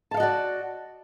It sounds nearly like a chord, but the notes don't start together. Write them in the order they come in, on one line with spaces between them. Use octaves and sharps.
A5 F5 D#5 F#4 D5